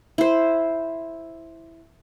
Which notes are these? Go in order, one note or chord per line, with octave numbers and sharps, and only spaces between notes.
E4 C5